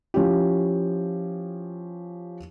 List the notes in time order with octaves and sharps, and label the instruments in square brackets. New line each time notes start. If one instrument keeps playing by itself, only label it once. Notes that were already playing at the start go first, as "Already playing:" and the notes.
[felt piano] F3 C#4 E4 G4